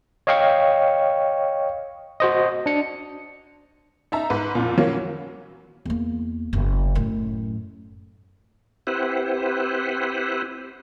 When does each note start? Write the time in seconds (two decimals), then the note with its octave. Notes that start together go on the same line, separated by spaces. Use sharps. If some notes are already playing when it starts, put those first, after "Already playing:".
0.27 C#5 D#5 F5 G5 C#6
2.20 F#4 C5 D#5
2.66 D4 C#7
4.12 D#4 E5 A5 A#5
4.30 G#2 B4
4.55 F2 A#2
4.77 E3 F#3 A#3 C#4
5.85 E2 A#3
6.53 F#1
6.95 F#2 A2
8.87 C4 E4 G4 B4 C5 F#5